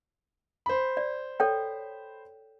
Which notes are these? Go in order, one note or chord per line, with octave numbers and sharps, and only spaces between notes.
C5 B5
D5
A4 C#5 G5